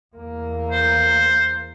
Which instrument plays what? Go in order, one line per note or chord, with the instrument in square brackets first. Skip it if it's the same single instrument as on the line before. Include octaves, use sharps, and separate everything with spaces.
[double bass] E2 A#3
[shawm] C5